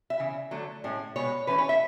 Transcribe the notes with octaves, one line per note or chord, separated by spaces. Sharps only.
E5
C#3 E3
D3 F#3 A3
A2 G#3 C#4
B2 G#3 B3 C#5
E3 A3 C#4 B4
C#5
E5